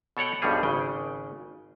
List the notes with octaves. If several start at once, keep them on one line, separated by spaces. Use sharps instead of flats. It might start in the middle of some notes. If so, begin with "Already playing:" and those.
B2 A4 C#5 F#5 G5
B1 G2 B2 F3 G3 G#4
G#1 C#3 G5